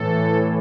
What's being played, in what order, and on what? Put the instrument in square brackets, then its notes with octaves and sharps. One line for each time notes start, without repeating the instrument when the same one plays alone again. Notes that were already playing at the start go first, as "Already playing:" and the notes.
Already playing: [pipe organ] A2 E3 A4